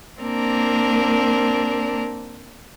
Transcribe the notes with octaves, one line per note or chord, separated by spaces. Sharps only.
A#3 C4 D4 A#4